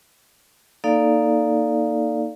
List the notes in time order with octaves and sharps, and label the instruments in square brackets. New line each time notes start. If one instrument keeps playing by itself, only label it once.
[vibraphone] A#3 D#4 A4 D5 F5